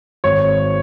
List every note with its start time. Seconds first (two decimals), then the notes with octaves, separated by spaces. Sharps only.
0.24 G#1 C#5